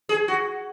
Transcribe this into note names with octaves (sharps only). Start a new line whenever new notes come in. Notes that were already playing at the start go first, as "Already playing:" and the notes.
G#4
F#4